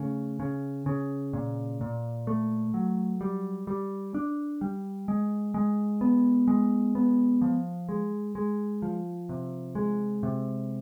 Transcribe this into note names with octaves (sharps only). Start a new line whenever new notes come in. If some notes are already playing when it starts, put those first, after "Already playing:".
Already playing: C#3 A3
C#3
C#3
A#2
A#2
A3
F#3
G3
G3
D4
G3
G#3
G#3
B3
G#3
B3
F3
G#3
G#3
F3
C3
G#3
C3